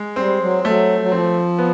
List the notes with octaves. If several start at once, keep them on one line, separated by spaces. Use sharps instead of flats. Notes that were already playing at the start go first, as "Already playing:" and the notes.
Already playing: G#3
G3 C4
F#3
F#3 A3
F#3
F3 C4
B3